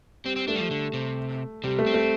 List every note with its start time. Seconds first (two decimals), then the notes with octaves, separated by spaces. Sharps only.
0.25 G3 C4
0.36 C4
0.48 A3 D4
0.55 G3
0.60 F3
0.71 D3
0.94 C3
1.64 C3 G3
1.79 A3
1.86 C4
1.94 A3